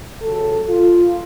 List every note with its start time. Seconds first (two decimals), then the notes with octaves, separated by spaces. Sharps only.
0.22 C#2 C#3 F#3 A4
0.68 F4